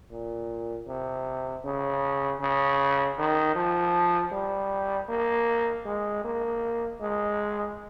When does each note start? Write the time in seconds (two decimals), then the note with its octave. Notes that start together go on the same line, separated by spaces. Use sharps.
0.11 A#2
0.87 C3
1.65 C#3
2.41 C#3
3.18 D#3
3.55 F3
4.32 G3
5.09 A#3
5.85 G#3
6.24 A#3
7.01 G#3